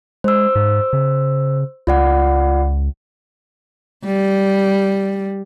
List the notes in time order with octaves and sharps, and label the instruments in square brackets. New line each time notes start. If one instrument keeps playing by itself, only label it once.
[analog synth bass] G#3 [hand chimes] C5 E6
[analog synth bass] G#2
C#3
[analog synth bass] C#2 [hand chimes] F4 D5 F#5
[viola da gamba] G3